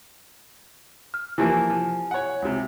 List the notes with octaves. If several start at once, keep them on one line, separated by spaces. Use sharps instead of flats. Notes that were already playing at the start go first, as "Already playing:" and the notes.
F6
E3 F3 A#3 E4 G4 G#5
F3
C#5 F#5
C#2 C3